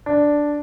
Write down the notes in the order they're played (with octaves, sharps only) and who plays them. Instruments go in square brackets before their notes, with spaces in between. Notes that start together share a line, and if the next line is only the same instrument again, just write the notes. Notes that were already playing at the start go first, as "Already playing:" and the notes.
[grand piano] D4